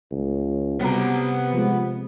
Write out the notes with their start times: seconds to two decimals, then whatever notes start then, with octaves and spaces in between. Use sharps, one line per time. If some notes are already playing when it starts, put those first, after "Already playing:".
0.12 C#2
0.81 C3 G3 B3 F#4 A#5
1.53 F3 G#3